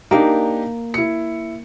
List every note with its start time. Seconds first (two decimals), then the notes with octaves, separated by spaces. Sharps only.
0.11 A#3 D4 D#4 G4
0.94 E4 C#7